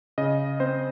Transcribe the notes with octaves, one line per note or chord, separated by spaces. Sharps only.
C#3 D#5
C4 C5